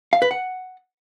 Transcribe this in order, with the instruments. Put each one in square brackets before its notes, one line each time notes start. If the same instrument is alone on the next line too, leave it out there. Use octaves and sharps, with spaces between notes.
[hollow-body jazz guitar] F5
B4
F#5